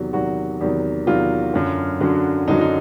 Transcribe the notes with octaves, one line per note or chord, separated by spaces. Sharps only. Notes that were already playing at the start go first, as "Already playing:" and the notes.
Already playing: E2 C3 D#3 F#3
E2 C3 D#3 F#3 F#4
E2 C3 D#3 F#3
E2 C3 D#3 F#3 F4
F#2 D3 F#3
F#2 D3 F#3
F#2 D3 F#3 D#4
D#4